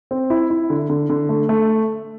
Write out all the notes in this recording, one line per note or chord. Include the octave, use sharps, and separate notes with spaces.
C4
E4
E4
D3
D3
D3
A3
A3